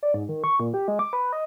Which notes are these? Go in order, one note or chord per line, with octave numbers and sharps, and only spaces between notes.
D5
G#2
D#3
C#6
A#2
G4
G#3
D6
B4
D#5